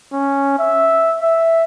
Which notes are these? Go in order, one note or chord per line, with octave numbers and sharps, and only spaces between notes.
C#4
E5
E5